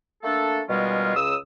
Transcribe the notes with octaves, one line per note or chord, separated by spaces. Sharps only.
A3 A#3 D4 A4
B2 D#3 G3 G#3 C#4 F4
C#2 C#3 D#6 E6